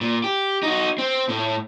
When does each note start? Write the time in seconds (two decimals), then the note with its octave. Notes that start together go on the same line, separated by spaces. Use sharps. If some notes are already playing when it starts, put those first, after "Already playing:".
0.01 A#2
0.24 G4
0.63 D#4 F#4
0.98 C4
1.29 A2